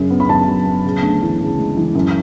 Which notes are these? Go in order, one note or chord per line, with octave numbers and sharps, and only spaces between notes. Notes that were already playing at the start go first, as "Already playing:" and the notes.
Already playing: F#2 C#3
B3
B5
F#2 A5
F#3
B3
C#3
D2
E3
C#3
G#3
E3
F#2